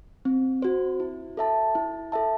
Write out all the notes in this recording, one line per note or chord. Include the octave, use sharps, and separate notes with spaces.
C4
F#4 C5
E4
A4 E5 A5
E4
A4 E5 A5